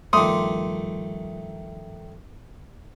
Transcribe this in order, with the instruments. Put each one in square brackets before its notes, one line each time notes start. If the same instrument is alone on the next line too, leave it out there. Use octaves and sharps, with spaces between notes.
[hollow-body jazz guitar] G2 F3 [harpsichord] D#3 A3 [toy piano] C6 D6 [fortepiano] D#6